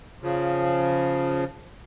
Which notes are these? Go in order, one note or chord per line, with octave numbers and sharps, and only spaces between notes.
C#3 F3